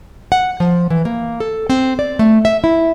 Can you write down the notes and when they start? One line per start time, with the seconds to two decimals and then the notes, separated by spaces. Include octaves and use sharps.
0.32 F#5
0.60 F3
0.90 E3
1.05 A#3
1.40 A4
1.70 C4
1.99 D5
2.19 A3
2.45 E5
2.64 E4